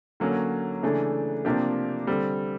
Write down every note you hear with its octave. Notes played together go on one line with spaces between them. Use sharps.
D3 F#3 A#3 C#4
C#3 E3 A3 D4
C3 F3 A#3 D4 G4
D3 G3 C4